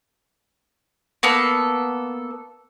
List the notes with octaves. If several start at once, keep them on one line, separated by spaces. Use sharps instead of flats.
A#3 B3 A4